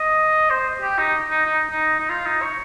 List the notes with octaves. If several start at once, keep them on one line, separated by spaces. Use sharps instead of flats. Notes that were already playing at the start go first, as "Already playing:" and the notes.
Already playing: D#5
C5
G4
D#4
D#4
D#4
D#4
D#4
F4
D#4
C#5